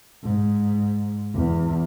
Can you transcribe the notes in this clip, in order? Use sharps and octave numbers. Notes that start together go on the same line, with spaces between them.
G#2
E2